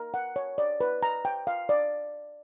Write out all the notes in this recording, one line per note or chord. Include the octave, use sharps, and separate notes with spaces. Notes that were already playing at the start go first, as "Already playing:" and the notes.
Already playing: A#4
F#5
C#5
D5
B4
A#5
G5
F5
D5